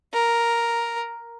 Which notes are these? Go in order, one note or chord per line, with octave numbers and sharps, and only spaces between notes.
A#4